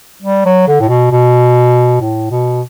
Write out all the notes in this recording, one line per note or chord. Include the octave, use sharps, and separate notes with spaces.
G3
F#3
D3
A2
B2
B2
A2
B2